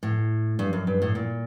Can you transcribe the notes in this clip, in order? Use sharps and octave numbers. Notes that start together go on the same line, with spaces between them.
A2
G2
F#2
G2
A2
A#2